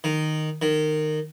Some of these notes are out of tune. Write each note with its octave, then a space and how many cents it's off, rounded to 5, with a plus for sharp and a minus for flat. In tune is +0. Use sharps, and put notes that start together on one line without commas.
D#3 -10
D#3 -20